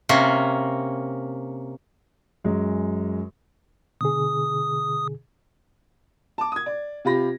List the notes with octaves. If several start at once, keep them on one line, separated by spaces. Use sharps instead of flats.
C3 A#3 C#4
F#2 G#3
B2 D3 G#4 D#6
A5 D6
D#6 G#6
D5
C3 F4 G4 B5 A#6